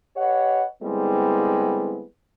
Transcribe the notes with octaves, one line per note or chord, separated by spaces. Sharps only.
G4 B4 C#5 D#5 F#5
D3 G3 G#3 B3 C4 E4